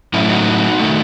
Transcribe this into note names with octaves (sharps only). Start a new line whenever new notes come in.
A2 F#3 A3 C#4 E4
D#4 F#4
D#3 A3